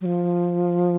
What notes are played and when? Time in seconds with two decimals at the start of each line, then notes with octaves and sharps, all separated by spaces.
0.01 F#3
0.06 F3